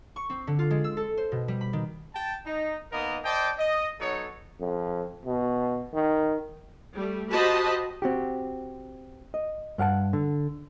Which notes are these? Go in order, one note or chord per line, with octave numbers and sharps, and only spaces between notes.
C#6
C4
D3
F4
G#3
E6
A4
C5
B2
G3
B5
D#3
G5 A5
D#4
D#3 A#3 B3 A#4 D#5
C5 D5 D#5 G5 A5
D#5
F#3 B3 D#4 A4 C#5
F2
B2
D#3
G3 A3
F#4 G4 C5 D#5 A5 B5
C4 F#4 G4
D#5
G2 F5 F#5 A5
D3